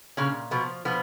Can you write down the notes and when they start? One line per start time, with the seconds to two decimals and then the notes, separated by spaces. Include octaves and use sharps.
0.17 A#2 C#3 C#4
0.51 B2 F3 B3
0.85 B2 F3 B3